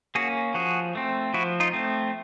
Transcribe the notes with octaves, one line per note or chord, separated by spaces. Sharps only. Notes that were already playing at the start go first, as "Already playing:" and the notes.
A#3 C#4 F#4 G#4
F3 F#4 G#4
A3 C4
F3 E4 F#4
D#4 F4
A3 C4